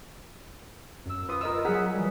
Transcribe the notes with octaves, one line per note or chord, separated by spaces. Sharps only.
F#2 E6
F4 B4 D#6
A#4 D#5 E6
F#3 G#4 F#5 E6 B6
E3 G3